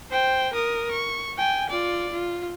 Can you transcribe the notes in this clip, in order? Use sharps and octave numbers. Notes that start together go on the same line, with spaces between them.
C5 G5
A#4 D#6
C#6
G5 G#5
F4 D5
F4